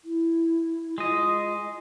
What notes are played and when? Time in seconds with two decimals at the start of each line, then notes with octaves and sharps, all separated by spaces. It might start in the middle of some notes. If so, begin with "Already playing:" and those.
0.05 E4
0.98 G#3 F4 D#5